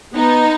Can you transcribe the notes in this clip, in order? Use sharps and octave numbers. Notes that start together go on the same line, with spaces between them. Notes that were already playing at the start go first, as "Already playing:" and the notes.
B3 D#4